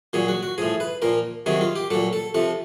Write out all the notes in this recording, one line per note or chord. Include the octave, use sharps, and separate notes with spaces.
A#2 F#3 G#4
F#4
F#4
A2 F3 G#4
B4
A#2 F3 A#4
C3 D#3 F#3 G#4
F4
G4
A#2 F#3 A4
A4
C3 F3 A4